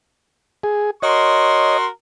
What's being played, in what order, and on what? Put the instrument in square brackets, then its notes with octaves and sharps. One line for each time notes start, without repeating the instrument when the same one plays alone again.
[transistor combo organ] G#4
[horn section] F#4 A#4 C6 [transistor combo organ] C#5 D#5